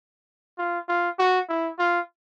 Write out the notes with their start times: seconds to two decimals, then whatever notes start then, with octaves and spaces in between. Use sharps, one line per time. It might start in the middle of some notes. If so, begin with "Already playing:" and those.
0.58 F4
0.88 F4
1.19 F#4
1.49 E4
1.79 F4